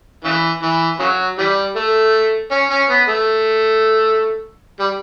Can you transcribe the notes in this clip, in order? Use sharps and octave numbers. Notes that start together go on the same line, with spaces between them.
C#3 E3
E3
C#3 F#3
E3 G3
A3
C#4
C#4
B3
A3
G3